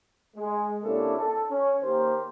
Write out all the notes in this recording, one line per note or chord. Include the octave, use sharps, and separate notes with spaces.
G#3
C3 A#3 C#4 D4 E4 A4
A4
C#4
D#2 A#3 G4 A#4 C5